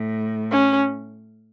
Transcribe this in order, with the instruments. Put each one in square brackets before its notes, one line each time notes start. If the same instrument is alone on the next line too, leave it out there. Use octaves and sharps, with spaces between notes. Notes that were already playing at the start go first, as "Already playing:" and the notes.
Already playing: [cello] A2
[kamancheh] C#4